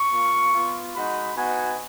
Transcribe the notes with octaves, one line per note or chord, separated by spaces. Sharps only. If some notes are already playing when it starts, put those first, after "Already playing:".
Already playing: C#6
A#3 F4
B3 F4
G#3 D#4 F#4 B5
B3 D#4 F#4 G#5